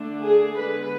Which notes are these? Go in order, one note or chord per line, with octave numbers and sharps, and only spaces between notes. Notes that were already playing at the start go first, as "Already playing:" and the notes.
Already playing: D3 A3 D4
G#4
D3 G#3 B3 B4